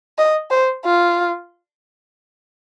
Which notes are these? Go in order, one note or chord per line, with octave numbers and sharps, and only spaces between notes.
D#5
C5
F4